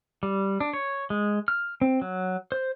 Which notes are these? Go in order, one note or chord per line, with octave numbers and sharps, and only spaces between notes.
G3
D4
C#5
G#3
F6
C4
F#3
C5